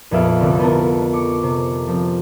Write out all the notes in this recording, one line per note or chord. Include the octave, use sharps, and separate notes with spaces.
A#1 F2 B3 E5 F5 D7
C2 D3 C4
B3 A4 A#4
C#6 D6 C#7
C3
F3 C4